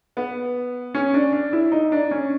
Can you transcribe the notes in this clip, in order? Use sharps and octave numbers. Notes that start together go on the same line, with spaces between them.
B3
C#4
D4
D4
E4
D#4
D4
C#4